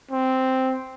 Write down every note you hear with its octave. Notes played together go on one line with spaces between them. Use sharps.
C4